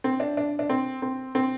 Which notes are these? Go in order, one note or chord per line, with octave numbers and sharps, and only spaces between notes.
C4
D4
D4
D4
C4
C4
C4